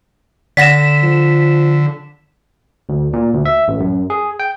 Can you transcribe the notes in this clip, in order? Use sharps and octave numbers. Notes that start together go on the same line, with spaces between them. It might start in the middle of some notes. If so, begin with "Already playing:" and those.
D3 D5 F#5 A#6 B6 E7
F3
D2
A#2
D2
E5
A1
F#2
G#4
G5